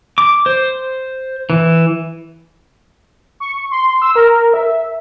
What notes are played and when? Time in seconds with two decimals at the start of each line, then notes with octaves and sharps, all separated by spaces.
0.18 D6
0.46 C5
1.50 E3
3.40 C#6
3.71 C6
4.02 E6
4.16 A#4
4.54 E5